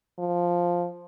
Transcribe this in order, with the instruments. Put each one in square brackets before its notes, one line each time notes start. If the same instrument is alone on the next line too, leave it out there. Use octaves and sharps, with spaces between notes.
[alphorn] F3